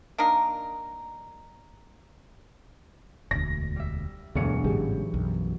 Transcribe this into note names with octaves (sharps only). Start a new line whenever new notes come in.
A#3 D4 D#4 A#4
E1 D2 A#6
G3 E5
E1 D2 G2 D3 E3 F#3 C#7
A1 G#2 C#3 G4 G#4
B1 F#2